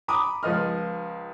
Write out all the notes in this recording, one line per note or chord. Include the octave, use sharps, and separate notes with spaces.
A#5 B5 D6 D#6
C#2 F3 D#5 F6